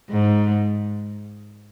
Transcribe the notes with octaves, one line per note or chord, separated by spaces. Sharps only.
G#2